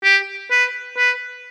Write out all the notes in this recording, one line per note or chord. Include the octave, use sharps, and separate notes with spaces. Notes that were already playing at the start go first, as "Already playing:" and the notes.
G4
B4
B4